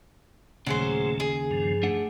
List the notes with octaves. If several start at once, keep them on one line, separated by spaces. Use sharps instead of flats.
D#2 A#2 C#3 F#3 A3 G#4 C5
G#4
G2 F3
A3 D4 F#5